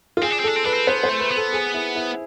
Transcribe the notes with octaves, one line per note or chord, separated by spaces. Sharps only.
F4
C4 G#4
D4
C4
D4 A4
C4
D4 B4
C4
B3 C5
C5
A3
B4
B3
A4
G#4
E4
E4